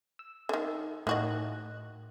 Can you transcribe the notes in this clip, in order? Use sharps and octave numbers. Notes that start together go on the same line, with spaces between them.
E6
D3 D#3
A2 D#3 F#4 D#5 F#6